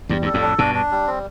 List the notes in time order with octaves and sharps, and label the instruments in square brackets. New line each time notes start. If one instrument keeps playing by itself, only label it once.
[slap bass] E2 G2 [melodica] G3
[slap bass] G2 [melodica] A4
[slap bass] F2 A2
[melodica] D4
[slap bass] G2 B2 [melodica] D4
[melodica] D4
G3
C4